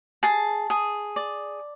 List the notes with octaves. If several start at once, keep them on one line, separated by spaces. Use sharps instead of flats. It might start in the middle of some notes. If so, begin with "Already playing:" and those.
G#4 A5
G#4
D5